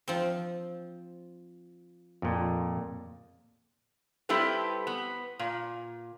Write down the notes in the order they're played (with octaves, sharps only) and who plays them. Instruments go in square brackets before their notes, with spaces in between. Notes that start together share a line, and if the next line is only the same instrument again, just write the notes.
[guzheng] F3 C4
[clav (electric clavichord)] F2 A#2
[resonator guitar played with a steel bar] G3 C4 E4 G4 A4 B4
B3
A#2